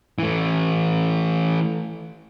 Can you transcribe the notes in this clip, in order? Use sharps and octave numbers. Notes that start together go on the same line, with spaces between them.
E3 A3